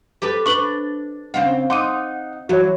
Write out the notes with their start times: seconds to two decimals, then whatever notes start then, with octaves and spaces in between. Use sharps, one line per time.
0.22 G4 A4 B4
0.46 D4 B4 C#6 F#7 G7
1.34 C#3 C4 F5 F#5
1.70 D#4 F#5 C6 D6 D#7
2.49 E3 F#3 F#4 C#5